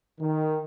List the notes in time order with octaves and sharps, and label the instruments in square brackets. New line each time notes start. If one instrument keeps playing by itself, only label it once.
[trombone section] D#3